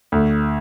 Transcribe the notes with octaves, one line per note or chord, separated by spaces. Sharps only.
D2